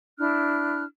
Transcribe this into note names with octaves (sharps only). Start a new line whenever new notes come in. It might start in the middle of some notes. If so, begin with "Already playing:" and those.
D4 E4 F6 F#6